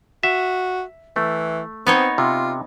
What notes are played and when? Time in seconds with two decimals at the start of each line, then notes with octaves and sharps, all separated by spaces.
0.23 F#4 E5
1.16 E3 A3
1.87 B3 C4 D#4 C#5
2.18 C3 F4